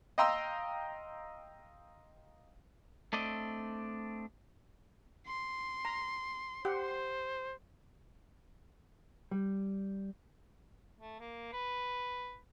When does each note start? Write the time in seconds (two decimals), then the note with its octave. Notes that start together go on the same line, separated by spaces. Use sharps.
0.18 D#5 F5 G5 A#5 C6 E6
3.13 A3 C4 D4 D5 D#5
5.27 C6
5.85 A#5
6.65 G4 C5 F#5
9.31 G3
10.99 A3
11.20 A#3
11.53 B4